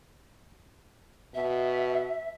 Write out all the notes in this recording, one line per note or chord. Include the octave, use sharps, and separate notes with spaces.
B2 E5